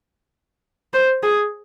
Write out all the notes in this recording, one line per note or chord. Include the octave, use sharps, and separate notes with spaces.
C5
G#4